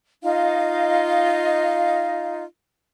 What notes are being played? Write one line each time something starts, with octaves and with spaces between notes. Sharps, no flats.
D#4 F4 D#5 F5